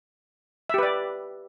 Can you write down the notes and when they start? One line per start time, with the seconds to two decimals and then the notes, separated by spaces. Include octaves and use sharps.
0.69 E5
0.74 G4
0.78 B4
0.83 D5